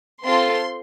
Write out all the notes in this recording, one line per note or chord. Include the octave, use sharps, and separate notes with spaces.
C4 F4 A4 C6